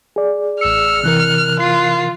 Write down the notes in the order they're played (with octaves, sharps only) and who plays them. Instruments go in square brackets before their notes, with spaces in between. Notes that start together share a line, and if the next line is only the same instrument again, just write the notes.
[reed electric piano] G#4 D5
[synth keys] A1 C#7 [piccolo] E6 [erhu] F6
[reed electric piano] C3 E3 A#4 [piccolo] F#6
[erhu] F4 [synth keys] C7